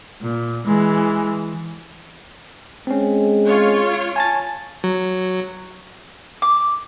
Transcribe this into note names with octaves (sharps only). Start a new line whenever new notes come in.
A#2
E3 G#3
G#3 C4 C#4
F4 C#5
G#5 A5 A6
F#3
D6